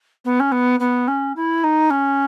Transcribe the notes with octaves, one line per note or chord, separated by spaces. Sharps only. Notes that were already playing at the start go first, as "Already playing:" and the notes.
B3
C#4
B3
B3
C#4
E4
D#4
C#4